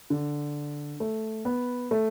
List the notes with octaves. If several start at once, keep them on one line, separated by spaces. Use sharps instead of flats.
D3
A3
B3
A3